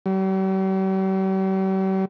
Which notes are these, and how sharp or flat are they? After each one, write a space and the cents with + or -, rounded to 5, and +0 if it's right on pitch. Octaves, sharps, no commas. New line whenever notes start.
G3 -45